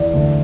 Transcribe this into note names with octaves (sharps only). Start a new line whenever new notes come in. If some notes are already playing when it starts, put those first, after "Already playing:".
Already playing: E2 D5
D2